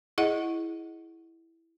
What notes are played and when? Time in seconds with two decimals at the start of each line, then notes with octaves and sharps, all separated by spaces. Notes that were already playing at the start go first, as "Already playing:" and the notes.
0.18 E4 G#4 D#5 F#5